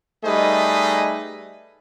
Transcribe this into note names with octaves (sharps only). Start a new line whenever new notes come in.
G3 A3 D#4 G#4 B4 D#5